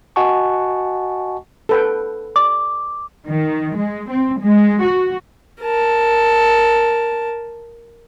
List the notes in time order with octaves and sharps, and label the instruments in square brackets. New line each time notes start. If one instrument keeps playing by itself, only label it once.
[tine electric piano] F#4 D#5 F#5 G#5 A5 C#6
[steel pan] A4 B4 G5
[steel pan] D5 [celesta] D6
[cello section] D#3
G#3
C4
G#3
F#4
[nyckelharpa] A#4 A5